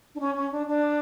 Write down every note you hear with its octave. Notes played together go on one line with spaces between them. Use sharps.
D4
C#4
C#4
D4
D4